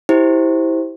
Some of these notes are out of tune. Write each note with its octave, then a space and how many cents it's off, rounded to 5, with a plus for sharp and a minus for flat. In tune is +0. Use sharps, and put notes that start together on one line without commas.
E4 -15 G4 +0 C5 +0